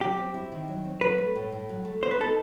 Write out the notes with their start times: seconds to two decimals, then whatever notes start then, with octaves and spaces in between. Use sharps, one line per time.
0.01 F#3 G4
0.18 C4
0.34 E4
0.52 D#3
0.68 F#3
0.85 C4
1.01 F#3 B4
1.18 A3
1.36 A2
1.52 A2
1.69 F#3
1.85 A3
2.03 B3 C5
2.11 B4
2.19 D#4 A4